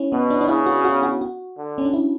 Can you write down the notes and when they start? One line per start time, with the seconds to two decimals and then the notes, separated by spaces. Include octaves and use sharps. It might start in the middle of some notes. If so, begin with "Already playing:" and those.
Already playing: C#4 E4
0.12 B2 B3
0.30 D4
0.41 D4
0.48 C#3 E4
0.66 F#4
0.85 F#4
1.03 F#4
1.21 F#4
1.58 D3
1.78 C#4
1.85 D4
1.94 E4